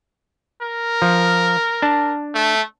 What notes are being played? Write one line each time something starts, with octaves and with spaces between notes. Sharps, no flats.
A#4
F3
D4 A5
A3